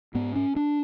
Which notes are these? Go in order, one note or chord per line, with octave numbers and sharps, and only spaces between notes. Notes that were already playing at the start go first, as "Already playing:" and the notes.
G#2 B3
C#4
D4